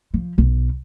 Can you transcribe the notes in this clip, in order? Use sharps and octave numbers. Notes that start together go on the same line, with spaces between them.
F3
B1